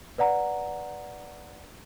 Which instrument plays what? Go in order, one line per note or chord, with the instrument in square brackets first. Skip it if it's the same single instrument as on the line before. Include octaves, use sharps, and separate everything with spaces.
[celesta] B4 D5 F#5 A#5